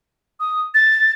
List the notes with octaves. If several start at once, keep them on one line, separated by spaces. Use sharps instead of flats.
D#6
A6